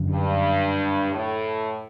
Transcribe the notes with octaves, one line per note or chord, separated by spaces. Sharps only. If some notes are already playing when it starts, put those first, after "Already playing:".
Already playing: F#2 D3 F#3
G2
A2